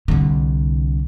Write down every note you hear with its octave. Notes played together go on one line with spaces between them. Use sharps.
C2 D3